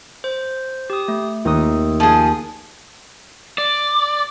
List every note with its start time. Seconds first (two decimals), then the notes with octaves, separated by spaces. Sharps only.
0.24 C5
0.90 G4 D#6
1.08 A3
1.45 D#2 D#4 D#6
2.00 F3 G#4
3.58 D5